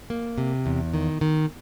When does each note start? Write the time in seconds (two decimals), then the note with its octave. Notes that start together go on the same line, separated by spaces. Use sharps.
0.10 A#3
0.38 C3
0.66 E2
0.94 D#3
1.21 D#3